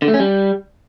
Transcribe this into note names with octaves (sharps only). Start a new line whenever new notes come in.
D3
A3
C#4
G3